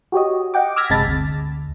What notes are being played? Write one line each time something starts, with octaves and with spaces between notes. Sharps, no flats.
F#4 G4 C#5 D#5
D#5 F#5 G5 D6
D6 E6 F6 G#6 A#6 B6
G1 C3 G#3 A5 B5 A6
D2